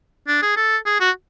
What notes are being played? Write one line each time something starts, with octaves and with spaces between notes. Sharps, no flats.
D4
G#4
A4
G#4
F#4